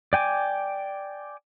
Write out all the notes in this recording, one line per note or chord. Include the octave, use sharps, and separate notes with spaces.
D5 G5 G#5 D6